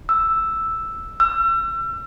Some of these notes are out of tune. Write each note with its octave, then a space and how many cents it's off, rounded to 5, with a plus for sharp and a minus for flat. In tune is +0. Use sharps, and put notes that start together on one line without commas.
E6 +0
E6 +35